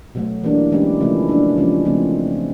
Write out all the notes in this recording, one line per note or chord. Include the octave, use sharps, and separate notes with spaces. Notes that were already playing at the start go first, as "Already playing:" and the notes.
B2 F#3 A3
E3 G3 A#3 D4
E3 G#3 C#4 E4 G4
C#3 F3 A3 C#4 E4
F#3 A#3 D4
C#3 F3 G#3 C#4
C#3 F3 A3 C4